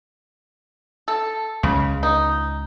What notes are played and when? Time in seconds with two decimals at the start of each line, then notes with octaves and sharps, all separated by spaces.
1.08 A4
1.63 C#2 C#3
2.03 D#4